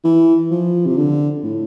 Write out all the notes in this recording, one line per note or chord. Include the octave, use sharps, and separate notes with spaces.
E3
F3
C3
D3
A2